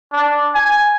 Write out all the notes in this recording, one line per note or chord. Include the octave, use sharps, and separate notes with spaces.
D4
G#5